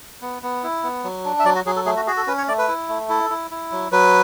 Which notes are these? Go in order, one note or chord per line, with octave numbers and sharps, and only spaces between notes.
B3
B3
E4
B3
F#3
D4
E5
F#3 D5
F#4
F#3 G#4
A4
A3 G#4
F#4
F#4 G#4
A4
C#4 B4
C#5
A3 D5
B4
E4
A3
E4 A4
E4
E4
F#3
F#3 B4